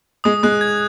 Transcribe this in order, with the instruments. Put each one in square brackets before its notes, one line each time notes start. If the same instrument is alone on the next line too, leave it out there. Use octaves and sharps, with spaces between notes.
[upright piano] G#3 [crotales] D#6
[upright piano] G#3 [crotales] F#6
[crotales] G#6